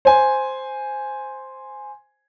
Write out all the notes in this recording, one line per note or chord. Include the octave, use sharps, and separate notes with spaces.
C5 G#5